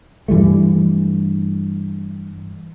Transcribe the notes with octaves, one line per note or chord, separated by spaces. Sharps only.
G2 E3 G3 A3